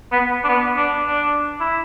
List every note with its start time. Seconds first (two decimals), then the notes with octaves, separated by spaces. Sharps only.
0.12 B3
0.44 D4
0.49 B3
0.76 D4
1.05 D4
1.60 E4